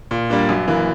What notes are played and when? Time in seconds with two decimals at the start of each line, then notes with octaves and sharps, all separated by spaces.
0.11 A#2
0.30 G3 A#3 D4
0.49 F#2
0.68 E3 A#3